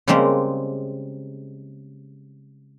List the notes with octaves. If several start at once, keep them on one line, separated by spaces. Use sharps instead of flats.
C#3 G3 G#3 A#3 C4